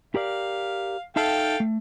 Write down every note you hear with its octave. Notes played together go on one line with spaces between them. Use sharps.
G4 A#4 D5 F5
D#4 A4 E5 F5 G5 A5
A3